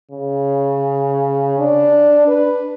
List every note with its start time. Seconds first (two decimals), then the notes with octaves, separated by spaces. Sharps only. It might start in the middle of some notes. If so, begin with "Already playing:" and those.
0.12 C#3
1.59 D4
2.28 B4